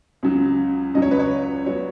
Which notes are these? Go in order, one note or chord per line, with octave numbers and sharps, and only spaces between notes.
C#2 C#3 F#3
C#2 C#3 F#3 D#5
C#5
B4
C#5
F#3 B3 C#5